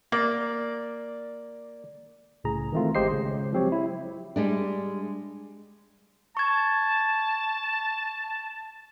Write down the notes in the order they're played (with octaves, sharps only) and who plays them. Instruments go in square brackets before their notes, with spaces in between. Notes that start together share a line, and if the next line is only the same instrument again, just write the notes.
[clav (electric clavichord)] A#3 [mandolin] D5
[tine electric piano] C2 A2 C#3 G#4 A#5
D#3 E3 G#3 A3 C4 F4
G#1 G#3 G4 C5 D#5 C7
C#3 G#3 C#4
F3 F#3 C4 G4 C#5
E4
[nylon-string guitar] G3 G#3 D4
[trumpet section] A5 [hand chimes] C#6 G#6